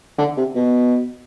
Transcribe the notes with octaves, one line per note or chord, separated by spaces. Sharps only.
D3
C3
B2